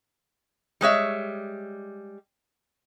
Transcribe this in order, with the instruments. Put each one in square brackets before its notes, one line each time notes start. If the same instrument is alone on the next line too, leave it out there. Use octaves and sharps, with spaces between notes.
[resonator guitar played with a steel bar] G3 G#3 C#5 E5